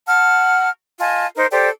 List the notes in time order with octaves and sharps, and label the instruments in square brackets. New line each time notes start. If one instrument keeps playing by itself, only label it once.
[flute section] F#5 A5 F6
F4 D#5 G#5 A5
D#4 A#4 C5
G4 A4 C5 D5